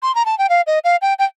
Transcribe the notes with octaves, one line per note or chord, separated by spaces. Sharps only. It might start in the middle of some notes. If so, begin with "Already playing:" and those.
C6
A#5
A5
G5
F5
D#5
F5
G5
G5